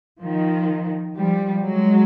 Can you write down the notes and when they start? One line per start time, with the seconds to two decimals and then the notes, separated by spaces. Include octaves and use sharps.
0.22 D#3 F3
1.17 F3 G3
1.63 F#3 G#3